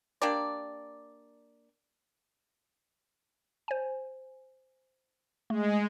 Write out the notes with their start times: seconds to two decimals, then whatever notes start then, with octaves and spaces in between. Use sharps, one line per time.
0.22 A#3 D4 G4 D5
3.68 C5 G#5
5.50 G#3 A3